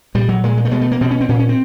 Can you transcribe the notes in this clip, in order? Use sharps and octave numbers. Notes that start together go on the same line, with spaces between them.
A#2 G3
F#3
A#2 G#3
G#3
A3
B2 G#3
A3
A#3
B2 C4
C#4
C4
A#2 C#4
C#4
C4